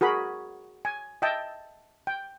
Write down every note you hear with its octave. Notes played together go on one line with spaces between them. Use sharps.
F#4 G#4 A#4 B5
G#5
D#5 E5 G5 A5
G5